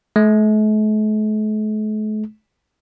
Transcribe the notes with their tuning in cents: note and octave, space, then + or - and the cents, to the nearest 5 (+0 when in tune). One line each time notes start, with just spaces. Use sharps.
A3 -45